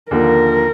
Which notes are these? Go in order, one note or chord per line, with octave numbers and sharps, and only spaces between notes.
D#2 D3 F3 A#3 A#4